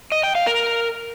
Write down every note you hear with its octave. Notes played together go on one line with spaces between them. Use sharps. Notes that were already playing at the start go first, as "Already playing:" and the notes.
D#5
G5
F5
A#4